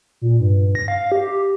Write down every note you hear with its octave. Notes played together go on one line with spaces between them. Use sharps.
A#2
G2
A#6
F5
G4